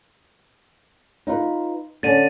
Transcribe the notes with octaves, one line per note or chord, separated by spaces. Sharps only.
D#4 F4 B4
D3 C#4 A6 D#7